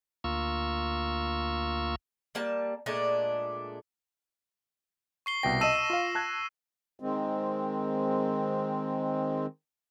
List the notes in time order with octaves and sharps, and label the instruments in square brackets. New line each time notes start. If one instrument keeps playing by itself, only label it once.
[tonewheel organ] D2 A#3 F4 C#6 E6
[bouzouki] G3 A#3 A5
A#2 G#3 A3 D4
[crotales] C#6 C7 G7
[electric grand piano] C2 B2 G5 [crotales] A#6
[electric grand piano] D#5 A5 [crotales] E6 D#7 E7
[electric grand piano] F4 F5
A5 F#6 G#6
[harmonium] D#3 G#3 C4